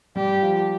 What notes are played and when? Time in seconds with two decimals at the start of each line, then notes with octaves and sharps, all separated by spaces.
0.16 G3 G4
0.42 F3